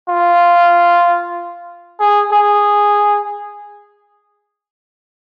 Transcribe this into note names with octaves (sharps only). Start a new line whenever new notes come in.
F4
G#4
G#4